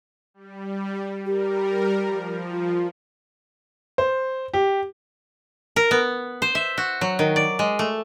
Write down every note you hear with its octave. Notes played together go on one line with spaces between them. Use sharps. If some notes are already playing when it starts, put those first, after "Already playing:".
G3
G3 G4 A#4
F3
F4
C5
G4
A#4
B3
C5
E5
F#4
F#3
D#3
D5
G#3
A3